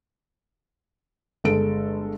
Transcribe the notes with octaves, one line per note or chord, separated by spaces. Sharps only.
G1 G#3 A4 D7